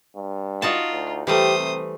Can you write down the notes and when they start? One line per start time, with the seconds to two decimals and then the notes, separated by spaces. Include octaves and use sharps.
0.16 G2
0.62 D#4 F4 F#4 A5
0.92 D2
1.27 E3 G3 A3 G4 C5 D#6
1.58 C3